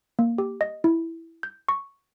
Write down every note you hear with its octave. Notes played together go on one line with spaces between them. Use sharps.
A#3
G4
D#5
E4
G6
C#6